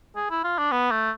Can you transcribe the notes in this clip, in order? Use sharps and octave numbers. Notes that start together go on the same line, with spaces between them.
G#4
E4
F4
D4
B3
A3